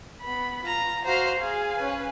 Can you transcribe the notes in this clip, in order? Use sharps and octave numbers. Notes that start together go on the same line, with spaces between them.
B3 B5
F4 A#5
F#4 C5 F5 A#5
G#4 F5 G#5
C#4 B4